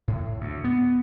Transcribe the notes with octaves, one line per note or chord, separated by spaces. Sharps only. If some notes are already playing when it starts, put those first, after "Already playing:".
A2
D2
B3